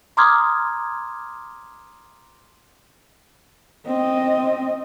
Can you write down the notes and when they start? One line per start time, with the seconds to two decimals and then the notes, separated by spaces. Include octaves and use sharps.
0.17 A#5 C6 D6 D#6 F6 G#6
3.85 C4 D#5